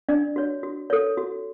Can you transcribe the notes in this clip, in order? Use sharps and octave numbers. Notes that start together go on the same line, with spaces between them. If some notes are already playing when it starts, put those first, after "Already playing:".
D4 D5
F#4 C#5
F#4
A4 C#5
F#4